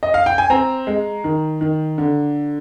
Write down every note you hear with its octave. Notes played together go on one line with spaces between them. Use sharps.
D#5
F5
G5
G#5
C4 A#5
G#3
D#3
D#3
D3